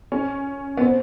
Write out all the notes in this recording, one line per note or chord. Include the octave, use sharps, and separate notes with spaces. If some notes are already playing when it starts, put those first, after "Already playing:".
C#4
B3
C4